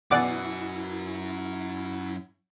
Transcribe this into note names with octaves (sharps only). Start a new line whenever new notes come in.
F#2 B2 E3 E4 F#4 D5 F#5 D6